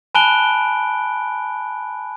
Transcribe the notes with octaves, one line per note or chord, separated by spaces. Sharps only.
G#5 A5 B5 F#6 D7 G7